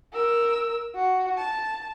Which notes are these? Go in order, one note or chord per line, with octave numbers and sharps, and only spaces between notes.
A#4 E6
F#4
A5